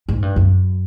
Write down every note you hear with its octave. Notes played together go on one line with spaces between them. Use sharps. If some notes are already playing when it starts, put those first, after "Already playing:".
G#2
G2
F#2